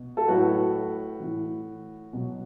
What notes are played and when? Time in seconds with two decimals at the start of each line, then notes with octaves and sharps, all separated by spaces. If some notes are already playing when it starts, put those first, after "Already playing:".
Already playing: B2
0.17 A4
0.28 A2 F#3 F#4 B4
1.20 A2 E3
2.13 B2 F#3